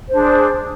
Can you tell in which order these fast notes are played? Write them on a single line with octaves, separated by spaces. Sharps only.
C5 D4 G#4